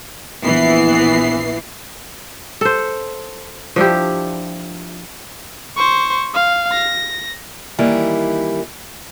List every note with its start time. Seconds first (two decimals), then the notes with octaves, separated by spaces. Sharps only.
0.44 A#1 E3 B3 C7
2.61 A4 C5
3.76 F3 D4 E4 G4
5.77 C5 C#6
6.34 F5
6.72 A#6
7.79 D#3 E3 G3 A#3 E4